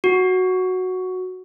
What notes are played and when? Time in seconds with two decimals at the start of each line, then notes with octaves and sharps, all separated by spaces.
0.04 F#4